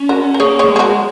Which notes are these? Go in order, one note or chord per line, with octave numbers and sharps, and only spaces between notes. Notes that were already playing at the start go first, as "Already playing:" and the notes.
Already playing: C#4
F#4 A#4
A#4
A#3 G#4 C#5
G#4 C#5
A#3
G#3
G#4
F#4 A#4